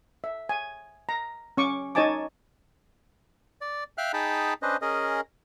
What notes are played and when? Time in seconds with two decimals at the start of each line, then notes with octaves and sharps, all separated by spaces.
0.24 E5
0.49 G#5
1.09 A#5
1.57 C#4 C#6 D6
1.95 D#4 C#5 D#5 G#5 A5 D6
3.61 D5
3.98 E5 F5 G5 F6 F#6
4.13 D#4 G#4 G5 A5 B5
4.62 C#4 D4 B4 C5 D#5
4.82 C#4 G#4 A#4 D#5